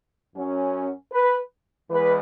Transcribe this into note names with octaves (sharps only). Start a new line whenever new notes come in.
F#2 F#3 C#4
B4
E2 E3 G#3 B4